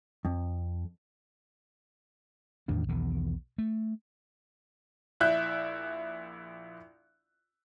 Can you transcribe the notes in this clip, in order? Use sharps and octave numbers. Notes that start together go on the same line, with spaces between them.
F2
E2 A2 D#3 D4
B1 E2 B2 D#3
A3
A#1 E4 E5 F#6 G6